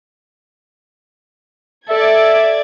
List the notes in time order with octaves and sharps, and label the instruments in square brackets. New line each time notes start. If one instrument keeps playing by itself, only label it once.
[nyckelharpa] A4 [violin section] D5 G#6 [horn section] E5